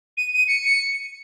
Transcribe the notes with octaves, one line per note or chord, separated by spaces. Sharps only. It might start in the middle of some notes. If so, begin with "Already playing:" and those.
D#7
D#7
C#7
C#7